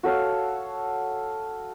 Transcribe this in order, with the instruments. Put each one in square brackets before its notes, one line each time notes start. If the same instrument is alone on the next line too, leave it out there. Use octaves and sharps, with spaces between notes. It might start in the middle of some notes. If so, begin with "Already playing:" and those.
[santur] F#4 A4 C#5 F5